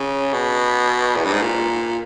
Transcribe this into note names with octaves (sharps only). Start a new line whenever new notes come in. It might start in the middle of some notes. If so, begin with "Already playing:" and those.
Already playing: C#3
B2
E2
G2
G#2
A#2